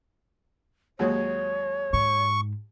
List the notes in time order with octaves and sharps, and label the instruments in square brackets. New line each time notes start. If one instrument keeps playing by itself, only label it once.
[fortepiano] D#2 F#3 G#3 [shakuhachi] C#5
[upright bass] G#2 [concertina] C#6